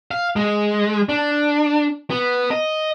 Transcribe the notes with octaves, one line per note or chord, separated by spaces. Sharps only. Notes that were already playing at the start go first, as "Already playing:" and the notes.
F5
G#3
D4
B3
D#5